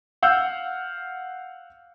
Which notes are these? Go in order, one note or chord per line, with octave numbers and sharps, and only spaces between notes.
F5 F#5 E6 F6 G6